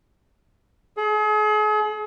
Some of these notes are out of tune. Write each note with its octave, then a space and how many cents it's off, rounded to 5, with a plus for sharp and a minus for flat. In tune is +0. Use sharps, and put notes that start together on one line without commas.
G#4 +40